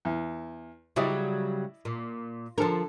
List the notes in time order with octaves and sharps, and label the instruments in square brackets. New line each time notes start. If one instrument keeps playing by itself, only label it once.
[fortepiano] E2
[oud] C#3 F#3 G3 [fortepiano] E4 D5 D#5
[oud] A#2
[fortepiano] D3 A4 [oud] F3 A#4